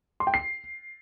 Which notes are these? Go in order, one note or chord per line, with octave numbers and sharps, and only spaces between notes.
C6
G5
C7